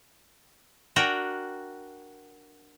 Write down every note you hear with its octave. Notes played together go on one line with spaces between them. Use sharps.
D4 F#4 A#4 G5